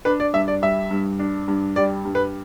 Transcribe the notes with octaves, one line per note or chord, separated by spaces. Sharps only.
D4 B4
D5
G2 E5
D5
G3 E5
G2
D4
G2
G3 D5
G2
B4